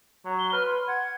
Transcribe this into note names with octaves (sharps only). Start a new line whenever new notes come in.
F#3
G7
B4 F6
C6
F#5 G#6